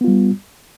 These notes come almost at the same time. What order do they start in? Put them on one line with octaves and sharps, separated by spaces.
B3 F4 G3